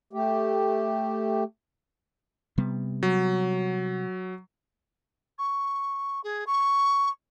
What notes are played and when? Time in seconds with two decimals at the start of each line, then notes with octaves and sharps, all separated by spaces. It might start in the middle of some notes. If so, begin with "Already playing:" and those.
0.13 A3 G4
2.58 C3 G3 B3
3.03 F#3
5.39 C#6
6.24 G#4
6.47 C#6